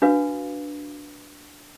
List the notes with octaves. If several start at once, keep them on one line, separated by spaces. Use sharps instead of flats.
D4 F#4 B4 F5